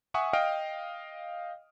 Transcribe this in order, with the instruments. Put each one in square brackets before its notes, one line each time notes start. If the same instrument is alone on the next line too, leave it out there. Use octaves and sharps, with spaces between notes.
[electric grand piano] E5 F#5 G#5 C#6 D#6
D#5 F5 G5 F6 D7